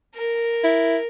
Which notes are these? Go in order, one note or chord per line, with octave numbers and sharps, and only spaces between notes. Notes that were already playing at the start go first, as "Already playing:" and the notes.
A#4
E4